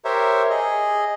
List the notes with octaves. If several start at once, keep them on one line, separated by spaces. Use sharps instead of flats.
G4 A#4 C5 C#5 E5
G#4 D#5